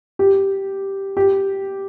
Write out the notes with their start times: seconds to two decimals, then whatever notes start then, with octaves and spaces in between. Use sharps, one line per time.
0.19 G4
1.17 G4